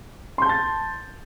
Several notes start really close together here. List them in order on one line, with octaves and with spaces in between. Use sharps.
C6 G6 A5 A6